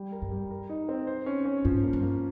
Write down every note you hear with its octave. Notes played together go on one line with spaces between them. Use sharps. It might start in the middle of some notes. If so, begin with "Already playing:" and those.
Already playing: G3
A#4
G2
G3
A#4
D#4
C4
C5
C#4
C#4
G#2 F3
A#3
G2
A#3